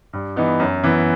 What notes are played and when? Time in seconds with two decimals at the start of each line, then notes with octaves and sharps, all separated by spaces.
0.13 G2
0.36 E3 B3 D#4
0.60 F#2
0.83 E3 B3